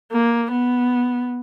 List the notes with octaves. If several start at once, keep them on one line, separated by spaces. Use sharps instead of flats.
A#3
B3